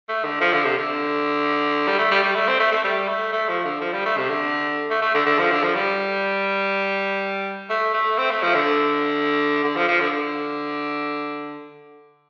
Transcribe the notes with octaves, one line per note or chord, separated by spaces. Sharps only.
A3
D3
F3
D3
C3
D3
G3
A3
G3
G3
A3
C4
A3
A3
G3
A3
A3
F3
D3
F3
G3
A3
C3
D3
A3
A3
D3
D3
F3
D3
F3
G3
A3
A3
C4
A3
F3
D3
D3
F3
F3
D3
D3